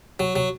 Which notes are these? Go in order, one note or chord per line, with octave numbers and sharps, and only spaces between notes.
F#3
F#3